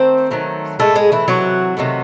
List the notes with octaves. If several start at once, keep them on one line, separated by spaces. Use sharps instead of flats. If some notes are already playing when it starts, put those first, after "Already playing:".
Already playing: D#3 A3 C4 C5
D#3 F#3 A3
A2 G#3 A3 A4
G#3 G#4
E3 E4
C3 E3 F#3 F#4
C3 D#3 F#3 A3